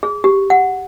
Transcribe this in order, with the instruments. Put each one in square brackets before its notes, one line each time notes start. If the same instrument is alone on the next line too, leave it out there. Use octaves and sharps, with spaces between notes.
[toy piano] G#4
G4
F#5